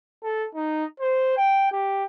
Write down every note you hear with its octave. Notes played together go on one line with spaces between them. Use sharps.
A4
D#4
C5
G5
G4